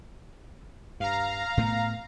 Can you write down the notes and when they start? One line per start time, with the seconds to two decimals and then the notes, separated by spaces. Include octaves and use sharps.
1.00 G2 F5 A#5
1.57 A2 A3 B3